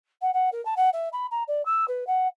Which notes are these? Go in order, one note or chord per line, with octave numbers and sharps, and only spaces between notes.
F#5
F#5
A#4
A5
F#5
E5
B5
A#5
D5
E6
B4
F#5